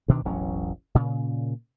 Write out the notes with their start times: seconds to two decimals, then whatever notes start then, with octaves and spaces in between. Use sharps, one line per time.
0.08 D2 B2 D#3 D4
0.25 E1 A1 F#3 C#4
0.95 A#2 C#3